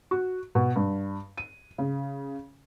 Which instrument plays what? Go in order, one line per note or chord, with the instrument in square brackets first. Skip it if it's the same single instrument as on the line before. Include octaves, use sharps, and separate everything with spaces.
[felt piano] F#4
B2
G2
D#7
C#3